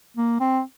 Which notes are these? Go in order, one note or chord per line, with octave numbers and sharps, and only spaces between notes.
A#3
C4